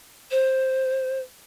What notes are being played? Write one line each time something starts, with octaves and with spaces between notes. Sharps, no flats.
C5